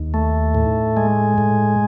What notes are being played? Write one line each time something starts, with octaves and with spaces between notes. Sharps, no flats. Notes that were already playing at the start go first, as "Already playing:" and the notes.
Already playing: D#2
A3
A2
G#3
A2